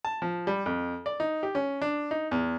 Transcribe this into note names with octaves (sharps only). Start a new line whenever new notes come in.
A5
F3
G3
F2
D5
D#4
G4
C#4
D4
D#4
E2